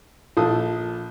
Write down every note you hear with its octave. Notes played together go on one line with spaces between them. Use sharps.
A#1 A4 D#6